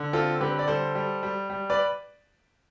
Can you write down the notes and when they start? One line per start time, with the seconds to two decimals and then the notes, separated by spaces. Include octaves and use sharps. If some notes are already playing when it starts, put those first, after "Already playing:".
Already playing: D3
0.13 C4 F4 A4
0.41 D3 G4 B4
0.59 D5
0.68 G3 A4 C5
0.95 G3
1.23 G3
1.50 G3
1.70 B4 D5